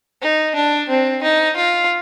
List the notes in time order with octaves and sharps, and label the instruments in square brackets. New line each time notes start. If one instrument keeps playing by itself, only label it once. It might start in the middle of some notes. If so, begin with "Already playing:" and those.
[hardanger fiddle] D#4
D4
C4
D#4
F4